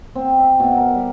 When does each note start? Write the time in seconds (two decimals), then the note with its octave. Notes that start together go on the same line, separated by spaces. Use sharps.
0.15 C4
0.39 E5
0.60 B2
0.77 A#4
0.95 G3